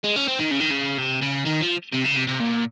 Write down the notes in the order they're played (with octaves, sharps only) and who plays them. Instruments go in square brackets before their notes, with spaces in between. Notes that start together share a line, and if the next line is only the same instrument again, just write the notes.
[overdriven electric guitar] G#3
C#4
C4
D#3
C#3
D#3
C#3
C3
C#3
D#3
F3
C3
C#3
C3
C3
A#2